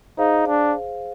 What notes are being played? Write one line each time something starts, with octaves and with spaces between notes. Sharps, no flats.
D#4 G#4 C5 F5
D4